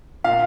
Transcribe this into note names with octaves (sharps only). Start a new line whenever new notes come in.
A#2 F5